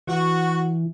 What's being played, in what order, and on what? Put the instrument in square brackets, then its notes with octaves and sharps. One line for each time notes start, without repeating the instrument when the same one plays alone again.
[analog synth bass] E3 [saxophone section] F#4